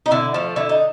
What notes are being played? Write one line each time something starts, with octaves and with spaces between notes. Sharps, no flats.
D#4
D3 E4
F3 A3
D3 E4
D#4